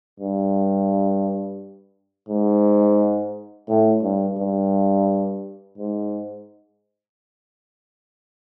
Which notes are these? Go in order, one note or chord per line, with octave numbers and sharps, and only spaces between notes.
G2
G#2
A2
G2
G2
G#2